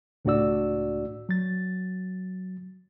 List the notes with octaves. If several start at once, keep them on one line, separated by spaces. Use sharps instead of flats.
C#2 A2 D4 F#4 D5 E6
F#3 A6